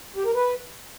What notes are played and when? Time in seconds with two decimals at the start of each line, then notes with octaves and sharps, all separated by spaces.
0.16 G4
0.25 A#4
0.34 B4